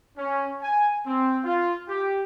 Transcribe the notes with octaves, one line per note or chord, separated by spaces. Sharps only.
C#4
G#5
C4
F4
G4